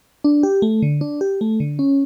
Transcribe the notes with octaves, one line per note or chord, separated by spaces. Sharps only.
D4
G4
A3
D3
D4
G4
A3
D3
C#4